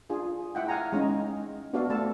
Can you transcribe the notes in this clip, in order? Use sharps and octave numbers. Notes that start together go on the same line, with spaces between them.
D4 F4 G#4
E4 E5 F#5 G5
F5 F#5 G#5 A#5
G#3 C#4 D#4
B3 D4 F#4 A4 D5 F5
A3 C4 A4 A5